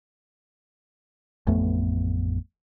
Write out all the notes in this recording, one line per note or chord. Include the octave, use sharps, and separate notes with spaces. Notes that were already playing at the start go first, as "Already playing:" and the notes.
A1 F2 A3 B3